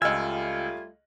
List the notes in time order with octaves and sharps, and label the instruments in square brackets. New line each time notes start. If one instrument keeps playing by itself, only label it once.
[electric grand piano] C#2 E6 [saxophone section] G3 A3 F4 [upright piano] D#5 F6 [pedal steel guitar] G#5